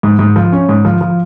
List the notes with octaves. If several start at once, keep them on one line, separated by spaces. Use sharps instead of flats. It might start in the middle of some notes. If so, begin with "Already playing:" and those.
G#2
G#2
F3
C#4
G#2
F3
F3